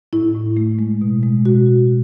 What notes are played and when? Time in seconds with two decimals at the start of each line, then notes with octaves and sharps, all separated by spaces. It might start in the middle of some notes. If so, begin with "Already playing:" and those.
0.13 A2 E4
0.34 A2
0.57 A3
0.79 G#3
1.01 B2
1.23 G#3
1.45 B2 F#4